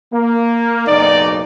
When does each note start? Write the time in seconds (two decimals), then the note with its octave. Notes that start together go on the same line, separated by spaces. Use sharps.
0.13 A#3
0.87 F#1 B1 D#4 D5